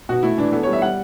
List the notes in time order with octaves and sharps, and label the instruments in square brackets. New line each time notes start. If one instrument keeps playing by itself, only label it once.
[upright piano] B2 F#4
A3 E4
E3 D4
B3 A4
C#5
G3
E5
G3 F#5